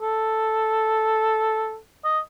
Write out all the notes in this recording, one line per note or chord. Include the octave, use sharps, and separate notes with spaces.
A4
D#5